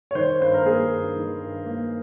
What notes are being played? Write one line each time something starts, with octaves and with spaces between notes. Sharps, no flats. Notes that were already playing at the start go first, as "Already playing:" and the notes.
C#5
D#3 C5
G2 C5
A#4
A#3 G#4
G2
D#3
G2
A#3